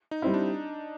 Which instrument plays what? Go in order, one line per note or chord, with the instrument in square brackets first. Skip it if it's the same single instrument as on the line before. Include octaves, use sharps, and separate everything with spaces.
[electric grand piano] D#4
[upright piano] G3 C4 E4
[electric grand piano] D4